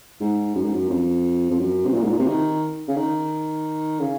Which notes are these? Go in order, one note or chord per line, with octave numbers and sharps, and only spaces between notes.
G#2
F#2
G#2
F#2
F2
F2
F#2
C3
A#2
G#2
A#2
C3
D#3
C#3
D#3
C#3